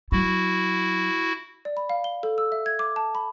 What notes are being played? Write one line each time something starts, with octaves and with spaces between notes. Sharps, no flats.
F#3 E4 F#4
D5
B5
F5
G7
A4
E6
E5
G#6
D6
A5
B5